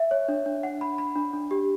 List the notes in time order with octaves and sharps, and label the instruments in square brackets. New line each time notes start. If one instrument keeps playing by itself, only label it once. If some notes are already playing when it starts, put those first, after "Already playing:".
Already playing: [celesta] E5
C#5
D4
D4
F#5
B5
B5
D4
D4
G4